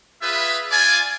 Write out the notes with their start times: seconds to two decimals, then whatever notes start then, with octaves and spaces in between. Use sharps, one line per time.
0.22 F4 G#4 B4 E5
0.71 F4 D5 G#5